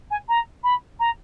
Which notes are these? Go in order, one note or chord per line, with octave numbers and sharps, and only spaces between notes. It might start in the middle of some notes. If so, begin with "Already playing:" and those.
G#5
A#5
B5
A#5